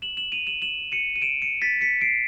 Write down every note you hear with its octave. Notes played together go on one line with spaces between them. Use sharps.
E7 F#7
E7 F#7
D#7 F7
E7 F#7
E7 F#7
C#7 D#7
D#7
D7 E7
C#7 D#7
A6 B6
B6 C#7
C7 D7